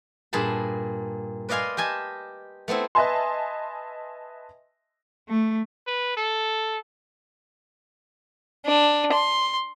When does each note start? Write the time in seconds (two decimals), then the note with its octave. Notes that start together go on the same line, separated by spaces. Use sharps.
0.33 G2 A#2 G#4 A5 B5
1.49 B4 D5 D#5 F5 G#5 C6
1.77 G4 D#5 G#5 A5
2.68 A3 B3 C4 E4
2.95 B4 D#5 E5 G#5 A5 C6
5.29 A3
5.87 B4
6.17 A4
8.66 D4
9.13 C6